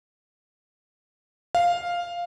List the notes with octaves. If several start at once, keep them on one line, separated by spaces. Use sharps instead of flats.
F5